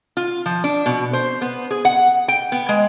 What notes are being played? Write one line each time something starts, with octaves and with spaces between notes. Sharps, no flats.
F4
F3
D4
B2
C5
B3
G#4
F#5
G5
B3
G#3